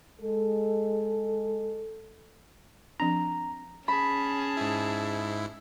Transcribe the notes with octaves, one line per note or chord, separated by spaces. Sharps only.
G#3 A4
F3 C4 D4 A#5
C#4 G#4 A5 B5
G#2 E4